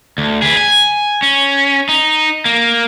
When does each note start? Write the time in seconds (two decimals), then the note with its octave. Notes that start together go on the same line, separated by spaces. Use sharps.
0.18 D2
0.42 G#4 B4
0.57 G#5
1.22 C#4
1.89 D#4
2.45 A#3